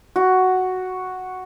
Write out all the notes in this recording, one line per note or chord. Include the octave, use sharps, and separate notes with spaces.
F#4